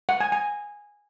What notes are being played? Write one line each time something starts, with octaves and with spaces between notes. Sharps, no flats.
F#5
G#5
G#5